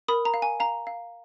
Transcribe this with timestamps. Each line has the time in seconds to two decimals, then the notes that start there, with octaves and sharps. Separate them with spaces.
0.08 A#4 B5 D#6
0.25 A#5
0.34 F5
0.42 G#5
0.60 F5 A#5
0.87 F5